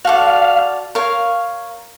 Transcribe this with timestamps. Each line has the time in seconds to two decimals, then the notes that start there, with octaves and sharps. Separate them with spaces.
0.05 F#4 A4 D5 F5
0.95 A#4 C#5 F5